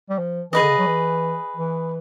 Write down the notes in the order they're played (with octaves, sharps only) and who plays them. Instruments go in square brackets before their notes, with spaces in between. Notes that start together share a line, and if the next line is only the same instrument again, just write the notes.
[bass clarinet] G3
F3
[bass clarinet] E3 [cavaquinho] G#4 B4 D#5
[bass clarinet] D3
C#3
F#3
E3
E3